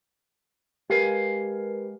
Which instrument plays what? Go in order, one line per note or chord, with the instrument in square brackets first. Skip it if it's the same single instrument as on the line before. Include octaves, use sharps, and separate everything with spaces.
[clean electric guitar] G#3 F5 G#5 [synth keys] G4 A#4 B4